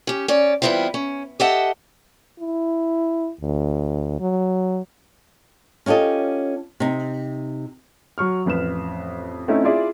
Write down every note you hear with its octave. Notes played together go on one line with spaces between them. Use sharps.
C#4 G4
C#4 C#5 D5
E3 G3 B3 C4 E4 F4
C#4
G4 A4 D#5 E5 F#5 A5
E4
D2
F#3
C#4 F4 G4 A4 D#5
C3 D#4
F#3 C#6 F6
A1 F2 B4 E7
A3 C4 C#4 D#4 E4
E4 F4 G#4 D5 E5